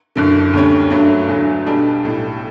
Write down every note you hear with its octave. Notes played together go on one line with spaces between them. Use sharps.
F#1 F#2 D3
D2 D3 G3 C#4
G2 F#3 A3 D4
E2 D3 F#3 A3
B1 B2 G3 D4 A4
B1 A2 G3